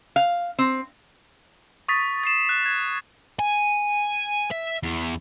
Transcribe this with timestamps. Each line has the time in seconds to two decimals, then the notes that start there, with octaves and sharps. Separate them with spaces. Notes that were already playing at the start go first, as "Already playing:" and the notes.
0.16 F5
0.59 C4
1.88 C#6 D#6 A6 B6
2.24 A6 C7 E7
2.49 F#6
2.65 G#6
3.39 G#5
4.51 E5
4.83 E2